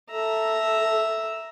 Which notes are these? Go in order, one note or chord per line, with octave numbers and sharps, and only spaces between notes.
A4 E5 A#5